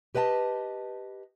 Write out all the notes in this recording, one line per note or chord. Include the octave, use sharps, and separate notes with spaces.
G4 B4 D#5 G5 A5